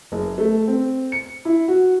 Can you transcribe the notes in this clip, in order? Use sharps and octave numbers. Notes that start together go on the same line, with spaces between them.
F#1
A3
C4
C#7
E4
F#4